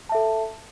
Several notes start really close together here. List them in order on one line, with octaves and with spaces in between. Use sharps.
A5 E5 A4